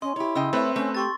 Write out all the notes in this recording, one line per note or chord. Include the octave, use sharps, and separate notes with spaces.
C#4 D#5 C6
E4 G4 C#5
C#3 D#5 G5 E6
A3 C4 B4 C#5 E5
A3 C#4
G4 C6 C#6 A6